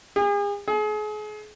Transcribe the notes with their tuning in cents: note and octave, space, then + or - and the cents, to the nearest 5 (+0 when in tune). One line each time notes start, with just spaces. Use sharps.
G#4 -40
G#4 +35